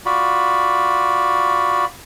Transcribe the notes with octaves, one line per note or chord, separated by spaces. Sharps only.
F4 F#4 D5 B5